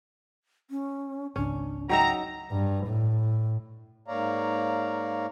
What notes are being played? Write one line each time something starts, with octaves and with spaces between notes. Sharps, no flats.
C#4
G#1 C#2 C#4 D4
F#3 D#4 E5 G5 A#5
G2
A2
G#2 A#3 C#5 D5 F5 A#5